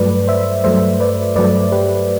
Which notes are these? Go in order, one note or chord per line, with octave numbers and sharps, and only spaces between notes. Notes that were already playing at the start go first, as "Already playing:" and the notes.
Already playing: G2 F#3 A3 B4 D5
C5 E5
G2 F#3 A3 C5 E5
B4 D5
G2 F#3 A3 B4 D5
G4 B4